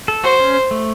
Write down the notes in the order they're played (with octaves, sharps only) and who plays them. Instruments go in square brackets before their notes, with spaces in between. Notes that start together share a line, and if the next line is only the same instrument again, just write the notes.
[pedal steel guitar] A4
[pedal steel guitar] F#4 [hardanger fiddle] C5
[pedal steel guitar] C#4
A3